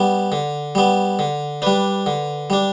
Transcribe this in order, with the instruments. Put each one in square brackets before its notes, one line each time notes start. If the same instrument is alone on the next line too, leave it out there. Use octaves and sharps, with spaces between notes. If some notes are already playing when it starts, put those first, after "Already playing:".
Already playing: [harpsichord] G3 B3
D3
G3 B3
D3
G3 D4 B4
D3
G3 D4